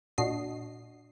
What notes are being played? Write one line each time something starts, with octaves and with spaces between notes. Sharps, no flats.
A#2 D4 F#4 D#5 C7